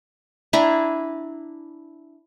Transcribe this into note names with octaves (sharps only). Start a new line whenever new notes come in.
D4 E4 G#5 A#5